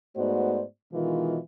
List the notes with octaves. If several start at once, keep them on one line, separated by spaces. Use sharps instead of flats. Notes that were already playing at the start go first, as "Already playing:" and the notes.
G#2 A3 B3 F#4 C5 D5
B2 D#3 E3 G#3 F4